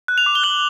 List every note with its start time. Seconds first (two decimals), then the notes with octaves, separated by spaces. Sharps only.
0.08 F#6
0.18 F7
0.26 D6
0.35 G7
0.44 F#6 F#7